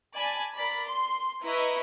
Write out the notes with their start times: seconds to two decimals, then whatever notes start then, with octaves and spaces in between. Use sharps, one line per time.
0.14 D5 G#5 A5 B5 G#6
0.55 A#4 D5 B5
0.87 C6
1.43 E4 B4 D#5 A#5 B5 C#6